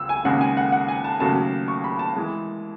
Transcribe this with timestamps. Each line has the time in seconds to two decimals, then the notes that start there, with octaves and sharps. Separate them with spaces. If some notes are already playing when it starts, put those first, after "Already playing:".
Already playing: C#2 E6
0.09 G#5
0.25 D#2 C#3 G#3 F#5
0.41 G#5
0.57 F#5
0.72 F#5
0.88 G#5
1.04 A5
1.20 D#2 C#3 F#3 A3 A5
1.68 C#6
1.84 B5
1.99 A5
2.16 E3 G#3